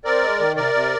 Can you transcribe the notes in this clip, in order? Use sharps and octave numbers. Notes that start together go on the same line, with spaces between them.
C4 A#4 D5
G#3
D#3
C3 A#4 D5
C3